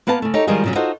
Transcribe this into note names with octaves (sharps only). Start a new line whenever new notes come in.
A#3 B3 B4 F5 A5
C#3 A3
D#4 G4 A4 C#5
D#3 F3 G3 G#3 F4 G#4
A#2 C#3 F#3
D#4 F4 F#4 A4 C5